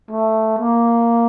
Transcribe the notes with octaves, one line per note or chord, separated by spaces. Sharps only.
A3
A#3